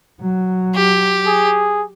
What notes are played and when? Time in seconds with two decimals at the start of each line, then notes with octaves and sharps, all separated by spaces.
0.21 F#3
0.75 G4
1.27 G#4